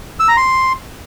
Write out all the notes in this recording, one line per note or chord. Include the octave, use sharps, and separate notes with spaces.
E6
A#5
C6